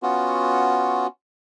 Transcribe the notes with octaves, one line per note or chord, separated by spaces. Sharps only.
B3 C#4 F4 F#4